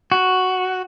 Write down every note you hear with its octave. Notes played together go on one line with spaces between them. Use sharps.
F#4